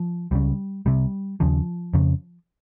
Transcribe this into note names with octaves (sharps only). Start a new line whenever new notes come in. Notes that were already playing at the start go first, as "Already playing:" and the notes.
Already playing: F3
C#2 C#3 G3
C2 C3 G3
D#2 C#3 F3
F2 C#3